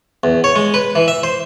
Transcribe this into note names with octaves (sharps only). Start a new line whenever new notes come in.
E2
C#5
G#3
B4
E3
E5
C5